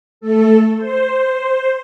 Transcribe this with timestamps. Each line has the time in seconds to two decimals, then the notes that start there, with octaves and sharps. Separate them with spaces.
0.21 A3 A4
0.78 C5